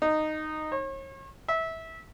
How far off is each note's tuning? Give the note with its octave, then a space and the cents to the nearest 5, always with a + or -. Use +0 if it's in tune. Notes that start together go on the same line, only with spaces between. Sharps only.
D#4 -10
C#5 -40
E5 -20